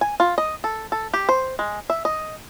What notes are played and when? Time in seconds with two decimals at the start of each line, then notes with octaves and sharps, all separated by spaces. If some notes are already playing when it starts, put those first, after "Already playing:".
0.01 G#5
0.20 F4
0.38 D#5
0.64 A4
0.92 A4
1.14 G4
1.29 C5
1.59 G#3
1.90 E5
2.05 D#5